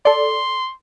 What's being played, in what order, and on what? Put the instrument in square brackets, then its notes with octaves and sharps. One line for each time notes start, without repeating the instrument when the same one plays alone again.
[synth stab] A4 D5 [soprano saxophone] C6